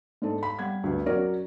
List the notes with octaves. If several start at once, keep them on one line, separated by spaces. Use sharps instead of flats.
G#2 D4 A4
B5
G3 F#5 G#6
D2 G2
F#3 C#4 F#4 A#4 D5